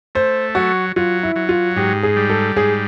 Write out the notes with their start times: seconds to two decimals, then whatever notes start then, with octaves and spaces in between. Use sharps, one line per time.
0.15 A3 C5
0.55 F#3 F#4
0.96 F#3 F4
1.23 E4
1.36 F#3
1.49 F4
1.76 G#2 G4
2.03 G#4
2.16 G3
2.30 A4
2.56 G#2 G#4